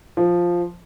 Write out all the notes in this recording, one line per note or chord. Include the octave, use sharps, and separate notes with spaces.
F3